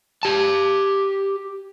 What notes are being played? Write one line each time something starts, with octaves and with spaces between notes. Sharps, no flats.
G4 A5